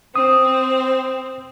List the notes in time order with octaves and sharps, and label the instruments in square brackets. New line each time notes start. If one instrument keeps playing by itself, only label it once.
[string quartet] C4 [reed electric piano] D#6